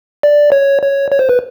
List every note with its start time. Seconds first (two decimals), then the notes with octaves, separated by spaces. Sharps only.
0.23 D5
0.52 C#5
0.82 C#5
1.11 C#5
1.19 C5
1.29 B4